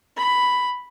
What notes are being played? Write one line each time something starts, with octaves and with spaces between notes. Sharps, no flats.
B5